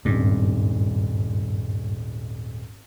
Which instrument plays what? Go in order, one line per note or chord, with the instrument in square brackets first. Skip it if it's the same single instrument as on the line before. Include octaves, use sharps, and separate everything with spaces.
[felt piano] D#1 G#1 [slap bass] G2